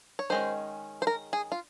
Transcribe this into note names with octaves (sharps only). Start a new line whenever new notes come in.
C#5
D#3 G#3 C#4 C5
C5
A#4
G#4
F4